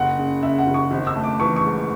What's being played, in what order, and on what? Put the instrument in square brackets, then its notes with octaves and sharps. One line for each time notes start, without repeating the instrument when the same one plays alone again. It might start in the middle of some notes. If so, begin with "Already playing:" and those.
Already playing: [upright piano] F#1 F#5
C#3
C#3 E5
F#5
F#1
C#6
G#1
E6
A3
D6
E3 C#6
C#6
G#2